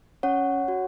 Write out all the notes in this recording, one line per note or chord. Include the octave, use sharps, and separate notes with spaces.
C#4 C#5 F#5
F#4